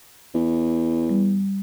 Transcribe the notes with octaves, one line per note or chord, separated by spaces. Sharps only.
E2
G3